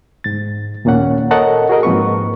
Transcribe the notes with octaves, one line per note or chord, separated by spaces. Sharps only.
G#2 A6
D#2 A#2 A#3 C#4 F#5
A4 A#4 C#5 D#5 F#5 A5
F#4 G#4 A#4 D#5
G#2 F3 A#3 C4 B4 C#6